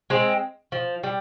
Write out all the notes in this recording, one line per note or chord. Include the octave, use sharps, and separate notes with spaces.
G#3 C4
F3
G3